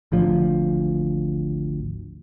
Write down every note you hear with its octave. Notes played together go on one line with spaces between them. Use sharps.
G#1 D2 F3